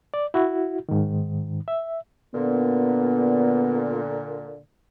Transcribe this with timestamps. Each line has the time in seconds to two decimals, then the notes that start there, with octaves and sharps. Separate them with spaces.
0.14 D5
0.34 E4 F#4
0.89 G#2 D#3
1.68 E5
2.35 A#2 D3 B3